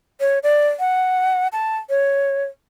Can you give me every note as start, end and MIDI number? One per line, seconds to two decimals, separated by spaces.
0.20 0.39 73
0.43 0.69 74
0.79 1.48 78
1.53 1.77 81
1.90 2.44 73